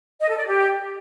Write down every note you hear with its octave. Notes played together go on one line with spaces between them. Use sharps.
D#5
A4
D5
G4